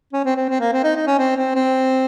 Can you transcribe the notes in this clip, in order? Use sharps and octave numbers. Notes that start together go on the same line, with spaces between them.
C#4
C4
C4
C4
A#3
C4
D#4
D#4
C#4
C4
C4
C4